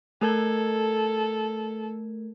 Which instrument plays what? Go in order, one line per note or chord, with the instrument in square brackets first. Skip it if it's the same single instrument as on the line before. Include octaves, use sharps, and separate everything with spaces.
[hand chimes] A3 A#4 G#6 [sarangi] A4